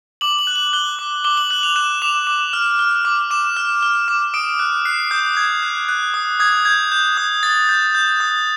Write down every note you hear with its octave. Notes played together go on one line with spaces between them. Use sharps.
D6 F#7
F#7
F#6
F#7
F#6 G7
D6
D6 G7
F#7
F#6 F#7
F7
F#6 E7
D6 F7
D6
F6
F6
D6
D6 E7
F6
F6
D6
D#6 D7
F#6
F#6 C7
D#6 G6
D#6 G#6
F#6
F#6
D#6
D#6 G#6
G6 G#6
G6
D#6
D#6 A6
G6
G6
D#6